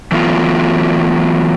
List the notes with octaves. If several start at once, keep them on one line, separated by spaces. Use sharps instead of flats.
E3 F#3 A3 B3 D#4 F4